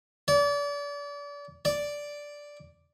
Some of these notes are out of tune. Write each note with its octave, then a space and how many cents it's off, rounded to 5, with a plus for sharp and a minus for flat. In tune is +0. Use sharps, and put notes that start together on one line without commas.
D5 -35
D5 -5